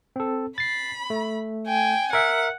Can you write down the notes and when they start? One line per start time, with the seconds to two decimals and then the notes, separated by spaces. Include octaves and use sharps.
0.16 C4 A4
0.58 B5 A6 C7
1.10 A3
1.67 G5 G#5
2.13 A#4 E5 F#5